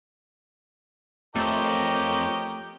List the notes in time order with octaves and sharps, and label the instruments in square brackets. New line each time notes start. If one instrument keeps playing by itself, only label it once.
[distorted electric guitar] F2 C5 [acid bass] A3 [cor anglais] G4 [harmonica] A#4 C#5 D#5